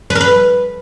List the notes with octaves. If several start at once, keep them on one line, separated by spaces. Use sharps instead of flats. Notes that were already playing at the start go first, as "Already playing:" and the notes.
B4
A#4
B4